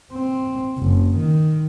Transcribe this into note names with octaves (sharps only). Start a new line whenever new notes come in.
C4
F#1
D#3